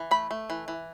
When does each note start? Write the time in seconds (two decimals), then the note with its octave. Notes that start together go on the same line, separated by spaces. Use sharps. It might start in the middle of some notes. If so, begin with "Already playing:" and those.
Already playing: E3
0.11 A3 B5
0.31 A3
0.50 E3
0.68 E3